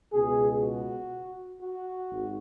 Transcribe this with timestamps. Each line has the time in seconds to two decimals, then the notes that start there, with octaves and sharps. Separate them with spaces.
0.12 C#2 B2 G#4
0.61 F#4
1.60 F#4
2.09 G#1